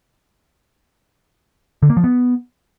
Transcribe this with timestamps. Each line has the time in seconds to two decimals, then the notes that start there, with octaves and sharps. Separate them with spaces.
1.82 D3
1.90 A#3
1.97 F3
2.04 B3